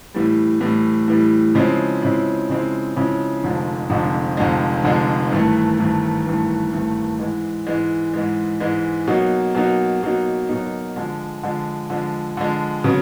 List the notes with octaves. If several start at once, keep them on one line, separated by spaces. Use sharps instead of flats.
A2 E3 G3
A2 E3 G3
A2 E3 G3
C#3 F3 G#3 C4 E4
C#3 F3 G#3 C4 E4
C#3 F3 G#3 C4 E4
C#3 F3 G#3 C4 E4
F1 F2 D3 F3 G#3
F1 F2 D3 F3 G#3
F1 F2 D3 F3 G#3
F1 F2 D3 F3 G#3
G#1 G2 E3 A3
G#1 G2 E3 A3
G#1 G2 E3 A3
G#1 G2 E3 A3
G#2 E3 G#3
G#2 E3 G#3
G#2 E3 G#3
G#2 E3 G#3
B2 F#3 A#3 D#4
B2 F#3 A#3 D#4
B2 F#3 A#3 D#4
B2 F#3 A#3 D#4
D3 F3 G#3
D3 F3 G#3
D3 F3 G#3
D3 F3 G#3
C#3 F#3 B3